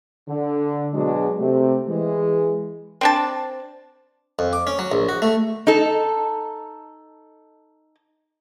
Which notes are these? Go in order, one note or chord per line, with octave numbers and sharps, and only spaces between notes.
D3
B2 F#3 G#3 D4 F#4 G#4
C3 A3 G4
E3 G#3
C4 D4 A5
F2
D6
C#4
F#3
A#1
F#4
A3
D#4 A4